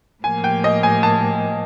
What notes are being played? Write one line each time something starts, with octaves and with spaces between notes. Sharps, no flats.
A2 F3 A#3 G#5
G5
D#5
G#5
A5